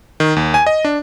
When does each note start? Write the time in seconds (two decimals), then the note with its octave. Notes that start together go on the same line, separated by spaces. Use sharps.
0.20 D#3
0.36 D#2
0.54 G#5
0.67 D#5
0.85 D4